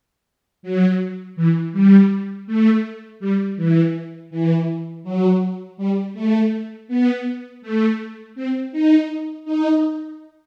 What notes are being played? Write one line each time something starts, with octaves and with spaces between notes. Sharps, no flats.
F#3
E3
G3
A3
G3
E3
E3
F#3
G3
A3
B3
A3
C4
D#4
D#4